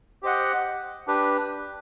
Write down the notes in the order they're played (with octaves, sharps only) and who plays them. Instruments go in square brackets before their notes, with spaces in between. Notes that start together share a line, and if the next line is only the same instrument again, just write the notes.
[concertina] G4 C5 D#5 F#5
D4 G4 B4